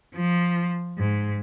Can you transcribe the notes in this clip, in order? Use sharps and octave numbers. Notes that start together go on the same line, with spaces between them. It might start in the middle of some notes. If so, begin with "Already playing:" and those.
F3
G#2